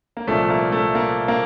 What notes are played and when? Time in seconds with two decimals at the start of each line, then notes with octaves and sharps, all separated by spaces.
0.17 A#3
0.27 C2 A#2 F3 A3
0.50 A#3
0.72 A3
0.95 A#3
1.28 A#3